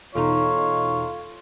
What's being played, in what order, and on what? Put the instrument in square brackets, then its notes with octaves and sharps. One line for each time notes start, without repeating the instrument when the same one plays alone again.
[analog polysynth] E2 B2 D#4 [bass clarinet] F4 [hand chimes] A4 A#5 [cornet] C#5